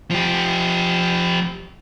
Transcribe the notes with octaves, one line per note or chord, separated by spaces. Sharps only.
F3 G4